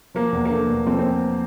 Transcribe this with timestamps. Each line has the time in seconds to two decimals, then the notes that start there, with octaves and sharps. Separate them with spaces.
0.15 F3 A#3
0.32 E2
0.45 A#3
0.50 D3 A3
0.69 E2
0.86 F3 C4
0.99 C4